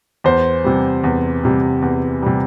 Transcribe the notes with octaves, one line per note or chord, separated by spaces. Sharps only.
E2 C5
C3 G3
E2
C3 G3
E2
C3 G3